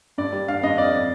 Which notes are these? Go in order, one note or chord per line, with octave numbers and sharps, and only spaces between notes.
G2 D5
G3
D4 F5
G2 D#5
F2 D5